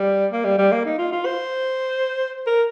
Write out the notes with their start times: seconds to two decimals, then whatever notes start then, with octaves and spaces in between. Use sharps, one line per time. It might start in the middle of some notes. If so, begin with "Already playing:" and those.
Already playing: G3
0.32 A#3
0.45 G3
0.58 G3
0.72 A#3
0.86 D#4
0.98 F4
1.12 F4
1.26 C5
2.47 A#4